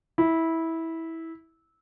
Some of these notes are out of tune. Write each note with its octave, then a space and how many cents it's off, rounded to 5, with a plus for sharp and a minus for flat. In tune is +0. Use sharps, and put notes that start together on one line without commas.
E4 -15